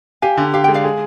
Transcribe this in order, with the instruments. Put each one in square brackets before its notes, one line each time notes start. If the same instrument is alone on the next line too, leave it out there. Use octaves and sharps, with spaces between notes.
[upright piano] G4 [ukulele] F5 G#5
[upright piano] D3
[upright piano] G4 [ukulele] F5
[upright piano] G#3 [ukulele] G5
[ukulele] D5 F5
[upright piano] G#4